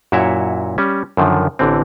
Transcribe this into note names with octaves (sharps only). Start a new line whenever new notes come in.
F#2 A#2 E4 F#4 C#5 E5
G3 C#4
F#2 D3 D#3 F3
A1 D3 E3 C4